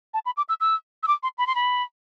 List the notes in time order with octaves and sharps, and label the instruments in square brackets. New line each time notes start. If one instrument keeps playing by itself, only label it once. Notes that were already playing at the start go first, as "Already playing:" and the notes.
[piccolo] A5
B5
D6
E6
E6
E6
D6
C6
B5
C6
B5